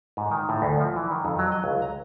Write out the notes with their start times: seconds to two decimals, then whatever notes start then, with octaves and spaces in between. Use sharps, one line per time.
0.17 G#2
0.31 D#3
0.49 A2
0.62 D2
0.80 F3
0.96 E3
1.11 D#3
1.25 F2
1.39 F#3
1.52 D#5
1.64 C#2
1.82 A#5